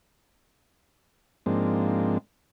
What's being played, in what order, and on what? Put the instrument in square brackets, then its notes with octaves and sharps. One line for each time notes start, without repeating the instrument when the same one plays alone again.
[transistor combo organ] G#2 F3 G#3 A#3 C4 D4